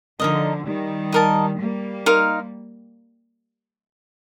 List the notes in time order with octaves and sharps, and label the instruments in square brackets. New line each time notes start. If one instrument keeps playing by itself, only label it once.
[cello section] D3 F3 [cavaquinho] D#4 A#4 D#5
[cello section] D#3 G3
[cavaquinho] D#4 A#4 D#5 A5
[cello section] G3 A#3
[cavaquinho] D#4 A#4 F5 C6